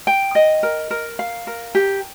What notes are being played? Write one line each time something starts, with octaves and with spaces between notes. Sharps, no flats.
G5
D#5
A#4
A#4
F5
A#4
G4